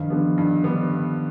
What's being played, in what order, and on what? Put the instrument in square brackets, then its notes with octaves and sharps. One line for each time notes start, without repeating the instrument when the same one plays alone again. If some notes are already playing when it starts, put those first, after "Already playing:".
Already playing: [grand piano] G2 [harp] D#3 F3
[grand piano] D3 G3 B3
G2
D3 G3 B3